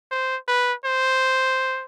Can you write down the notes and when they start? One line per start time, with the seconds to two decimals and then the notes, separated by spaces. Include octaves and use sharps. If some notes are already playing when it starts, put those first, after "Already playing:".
0.11 C5
0.48 B4
0.85 C5